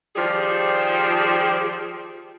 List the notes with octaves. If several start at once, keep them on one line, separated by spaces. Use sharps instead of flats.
D#3 F3 G3 G4 G#4 C5